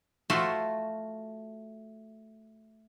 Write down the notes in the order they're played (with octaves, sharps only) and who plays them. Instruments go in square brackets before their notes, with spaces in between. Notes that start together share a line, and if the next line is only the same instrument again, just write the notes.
[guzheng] A3 F4 F#4 E5 C6